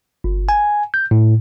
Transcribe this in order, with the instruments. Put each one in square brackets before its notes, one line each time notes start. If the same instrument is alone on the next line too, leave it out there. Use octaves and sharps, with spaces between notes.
[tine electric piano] G1
G#5
G6
A2